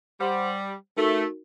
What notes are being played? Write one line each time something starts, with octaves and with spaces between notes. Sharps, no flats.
G3 C5 F#5 C6
A3 D#4 F#4 A#4